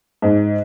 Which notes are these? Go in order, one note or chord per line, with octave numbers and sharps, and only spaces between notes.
G#2